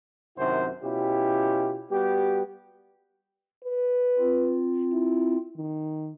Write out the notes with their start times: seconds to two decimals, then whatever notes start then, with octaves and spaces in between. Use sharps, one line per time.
0.37 F#2 C3 D#3 E4 F#4 C5
0.83 B2 C#4 E4 F4 G4
1.90 G3 B3 F#4 G4
3.64 B4
4.19 C4 F4
4.92 E4
5.56 D#3